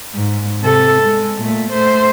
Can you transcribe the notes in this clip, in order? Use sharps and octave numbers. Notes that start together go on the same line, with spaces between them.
G#2
C3 A4
G#3
A#2 A3
A3 C5